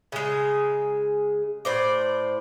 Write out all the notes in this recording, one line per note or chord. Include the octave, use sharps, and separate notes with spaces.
C#3 G#3
A2 C5 D5